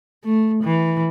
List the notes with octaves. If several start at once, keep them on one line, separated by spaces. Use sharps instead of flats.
A3
E3